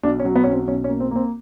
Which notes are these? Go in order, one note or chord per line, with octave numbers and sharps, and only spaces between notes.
B1 D4
C#4
F#3
B3
C#4
B1 C4
B1 C#4
C#4
A#3
C4
A#3 C4